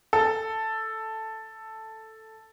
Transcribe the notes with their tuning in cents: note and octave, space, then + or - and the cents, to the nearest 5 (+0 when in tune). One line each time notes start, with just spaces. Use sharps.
A4 +0